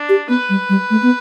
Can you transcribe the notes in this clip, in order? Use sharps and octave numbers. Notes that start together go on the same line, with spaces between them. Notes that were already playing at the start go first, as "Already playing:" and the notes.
Already playing: D4
G4
B3 B4
G3
G3
A3
B3